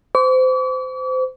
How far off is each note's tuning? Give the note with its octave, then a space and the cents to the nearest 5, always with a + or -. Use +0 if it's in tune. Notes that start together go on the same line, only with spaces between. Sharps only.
C5 -25 D6 -45